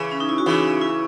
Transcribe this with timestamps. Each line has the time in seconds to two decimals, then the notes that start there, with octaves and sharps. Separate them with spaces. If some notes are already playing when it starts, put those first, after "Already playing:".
Already playing: C#3 E3
0.11 C#4
0.20 D#4
0.29 E4
0.38 F#4
0.46 C#3 E3 D#4
0.81 E4